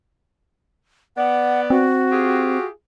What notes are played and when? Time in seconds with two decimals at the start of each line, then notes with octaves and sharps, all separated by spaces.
1.17 B3 D5 F#5
1.70 C4 F#4
2.11 F4 G4 G#4